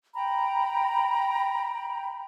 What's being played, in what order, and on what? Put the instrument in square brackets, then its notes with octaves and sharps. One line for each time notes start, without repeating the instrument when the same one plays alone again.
[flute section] G5 A#5 B5